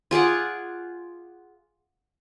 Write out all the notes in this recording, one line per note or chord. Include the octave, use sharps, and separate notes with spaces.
F4 G#4 D5 F#5